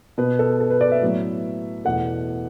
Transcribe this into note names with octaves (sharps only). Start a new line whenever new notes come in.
B2 B3 B4
A4
A4
B4
D5
E5
A2 F#3 B3
E2 B2 A3 F#5